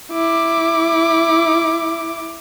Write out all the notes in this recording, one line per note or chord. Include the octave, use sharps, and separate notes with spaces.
E4 D6